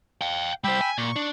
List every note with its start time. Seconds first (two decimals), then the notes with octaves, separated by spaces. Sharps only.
0.21 F5 G5
0.64 G3 C5 G5 B5 E6
0.81 G#5
0.98 A#2 C#6
1.16 D4